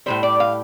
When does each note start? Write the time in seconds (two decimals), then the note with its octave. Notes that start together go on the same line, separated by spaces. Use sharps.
0.06 A2 E3 G3 C5
0.23 D5
0.40 F5